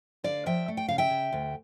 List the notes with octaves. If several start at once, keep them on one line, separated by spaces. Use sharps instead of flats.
D3 D5 F5
F3 E5 G5
A3
G5
C#3 F5
E5 G5
C#3
D2